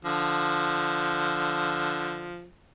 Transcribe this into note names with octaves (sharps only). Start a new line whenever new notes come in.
D3 F3